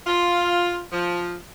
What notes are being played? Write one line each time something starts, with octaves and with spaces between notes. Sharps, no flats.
F4
F3